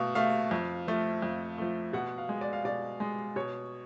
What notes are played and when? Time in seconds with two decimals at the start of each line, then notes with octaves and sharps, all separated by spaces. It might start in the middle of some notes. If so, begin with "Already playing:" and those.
Already playing: B2 A3 F5
0.15 A3 F5
0.51 F2
0.88 F3 A3
1.22 F2
1.58 F3 A3
1.93 B2 F#5
2.18 F5
2.29 G#3
2.41 D5
2.53 F5
2.65 B2 D5
3.00 G#3
3.36 B2 C#5